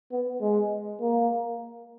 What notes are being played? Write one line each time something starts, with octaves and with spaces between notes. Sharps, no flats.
B3
G#3
A#3